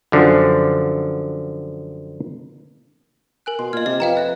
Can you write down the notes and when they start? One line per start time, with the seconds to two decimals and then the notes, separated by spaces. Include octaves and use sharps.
0.12 F#2 D3 F3
3.46 A#4 G#5 F#6
3.59 B2 C6
3.73 A#2 D#5 F6 G#6
3.86 C3 D#5
4.00 F2 F4 B4 D#5 F5 G5 A#5
4.17 D#5 E5 F#6